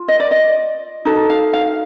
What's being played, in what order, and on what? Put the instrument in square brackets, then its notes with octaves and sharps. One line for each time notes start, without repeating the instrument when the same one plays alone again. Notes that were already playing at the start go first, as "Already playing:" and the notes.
Already playing: [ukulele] F4
D#5
D5
D#5
D#4 F#4 A4
F5
F5